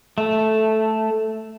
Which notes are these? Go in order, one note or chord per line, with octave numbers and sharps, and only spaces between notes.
A3